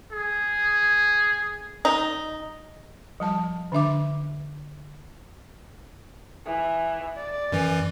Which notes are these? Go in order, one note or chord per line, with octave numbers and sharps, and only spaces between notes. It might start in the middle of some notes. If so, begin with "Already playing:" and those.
G#4
D#4
F3 G3 A5
D3 D4 E5 D6
E3
D5
F#2 E3